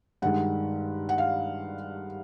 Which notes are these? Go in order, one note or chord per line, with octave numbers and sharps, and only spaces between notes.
G2 D#3 G#3 F#5
F#5
F5